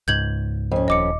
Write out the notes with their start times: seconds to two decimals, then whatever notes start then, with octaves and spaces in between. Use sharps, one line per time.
0.08 C#2 G#2 G6 G#6 F#7
0.72 F2 C#4
0.88 D#1 D#5 D6 C#7